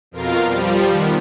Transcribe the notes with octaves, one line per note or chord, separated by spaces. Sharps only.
F2 B2 F4 A#4 F5
F3 G3
D#3 B3